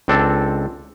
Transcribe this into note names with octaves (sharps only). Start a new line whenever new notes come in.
C#2 C4 D4 A4